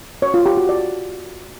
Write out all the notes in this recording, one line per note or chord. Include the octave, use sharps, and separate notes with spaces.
C#5
F4
G4
F#4
D5